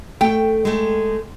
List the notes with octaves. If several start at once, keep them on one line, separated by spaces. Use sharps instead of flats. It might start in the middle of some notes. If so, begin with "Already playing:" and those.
A3 G5
G#3 A3